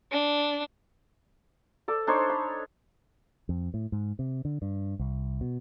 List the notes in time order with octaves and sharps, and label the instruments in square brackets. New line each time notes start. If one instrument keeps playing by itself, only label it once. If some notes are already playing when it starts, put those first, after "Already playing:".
[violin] D4
[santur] A4 D5
D4 D#4 C5 C#5
B5
[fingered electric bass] F2
A2
G#2
C3
D3
G2
C2
B2